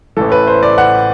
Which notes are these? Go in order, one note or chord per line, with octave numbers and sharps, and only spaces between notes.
A1 A2 E3 A4
B4
C5
D5
F#5